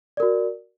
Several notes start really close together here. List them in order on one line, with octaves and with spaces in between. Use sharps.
D5 A#4 F#4